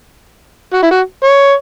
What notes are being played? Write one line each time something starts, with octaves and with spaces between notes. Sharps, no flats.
F#4
E4
F#4
C#5